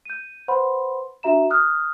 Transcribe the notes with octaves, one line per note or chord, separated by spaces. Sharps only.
G6 D#7
B4 C5 F#5 B5 C6
D4 F#4 E5 A#5 E7
D#6 F6 F#6